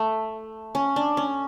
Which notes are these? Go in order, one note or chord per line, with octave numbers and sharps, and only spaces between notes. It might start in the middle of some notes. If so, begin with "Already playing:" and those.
Already playing: A3
C#4
D4
C#4